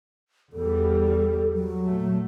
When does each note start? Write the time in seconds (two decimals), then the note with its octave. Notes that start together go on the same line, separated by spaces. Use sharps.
0.53 E2 G3 A4
1.53 F#3
1.86 A#2 A3